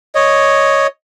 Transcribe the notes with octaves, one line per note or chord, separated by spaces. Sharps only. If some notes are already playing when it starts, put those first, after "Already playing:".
C#5 D#5